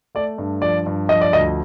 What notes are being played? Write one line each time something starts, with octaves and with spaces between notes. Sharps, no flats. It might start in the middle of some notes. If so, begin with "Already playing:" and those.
A3 D5
G2
F3 D5
G2
F3 D#5
D5
D2 D#5